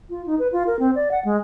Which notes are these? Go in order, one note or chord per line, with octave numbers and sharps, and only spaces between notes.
F4
D#4
B4
F4
A#4
C4
D5
F#5
G#3